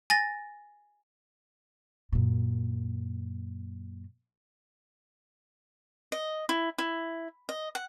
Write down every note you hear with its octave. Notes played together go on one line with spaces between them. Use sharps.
G#5 A6 A#6
F#2 A#2
D#5
E4
E4
D#5
F#5